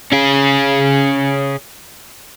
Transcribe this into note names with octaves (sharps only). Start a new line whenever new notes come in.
C#4 G#4